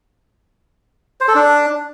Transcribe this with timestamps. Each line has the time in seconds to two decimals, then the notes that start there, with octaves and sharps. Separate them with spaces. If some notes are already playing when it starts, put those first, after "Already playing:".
1.21 C5
1.28 A4
1.35 D4